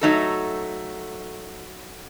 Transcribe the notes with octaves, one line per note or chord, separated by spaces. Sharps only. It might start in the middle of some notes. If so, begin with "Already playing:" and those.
F#3 A3 D#4 A4